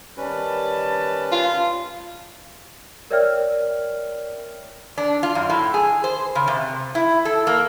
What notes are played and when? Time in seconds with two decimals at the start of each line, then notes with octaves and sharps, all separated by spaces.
0.17 D#3 G3 C#4 B4 A5
1.32 F4
3.11 A#4 C#5 D5 E5 G5 F6
4.98 D4
5.23 F4
5.35 F#2
5.50 A2
5.74 G#4
6.04 C5
6.35 C#3
6.48 C3
6.95 E4
7.25 A4
7.47 A#3